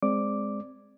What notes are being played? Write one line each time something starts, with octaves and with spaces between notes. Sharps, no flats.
G#3 C4 D5 D6